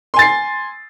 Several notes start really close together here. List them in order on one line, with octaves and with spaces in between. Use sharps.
C6 G#5 A6 C7